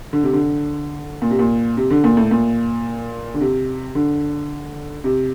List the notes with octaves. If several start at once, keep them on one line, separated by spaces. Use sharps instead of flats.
D3
C3
D3
A#2
C3
A#2
C3
D3
A#2
A2
A#2
D3
C3
D3
C3